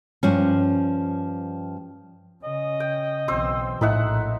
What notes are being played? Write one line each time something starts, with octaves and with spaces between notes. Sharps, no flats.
G2 F3 C#4
C#3 D#5
G5
B1 E3 C4 C5 E6
A#1 A2 D#4 E5 F#5